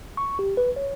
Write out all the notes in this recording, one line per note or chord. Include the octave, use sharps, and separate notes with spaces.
C#6
G4
B4
C#5